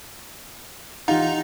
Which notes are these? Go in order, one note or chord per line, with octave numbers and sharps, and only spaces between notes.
E3 D#4 F4 G4 F#5 A#5